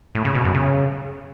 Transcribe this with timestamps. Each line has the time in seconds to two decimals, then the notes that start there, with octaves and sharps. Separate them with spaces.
0.15 A2
0.25 C#3
0.35 B2
0.44 F#2
0.54 C#3